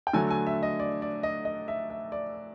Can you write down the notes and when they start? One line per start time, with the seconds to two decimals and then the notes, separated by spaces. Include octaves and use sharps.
0.07 G5
0.13 D3 F#3 A3 G#5
0.30 G#5
0.47 E5
0.63 D#5
0.80 D5
1.02 D5
1.23 D#5
1.45 D#5
1.68 E5
1.90 E5
2.12 D5